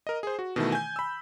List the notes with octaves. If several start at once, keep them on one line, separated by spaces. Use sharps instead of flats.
A#4 D#5
G#4 C5
F#4
B2 D#3 E3 A3
G#5 G6
B5 E6